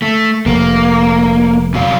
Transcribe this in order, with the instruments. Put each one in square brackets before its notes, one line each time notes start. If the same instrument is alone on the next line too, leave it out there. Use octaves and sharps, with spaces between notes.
[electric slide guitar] A3
[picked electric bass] F1 [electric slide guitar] A#3
[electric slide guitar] C3 F#3 F5